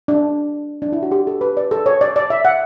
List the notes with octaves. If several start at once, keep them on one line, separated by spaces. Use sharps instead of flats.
D4
D4
E4
F#4
G4
A4
B4
D5
A4
C#5
D5
D5
E5
F#5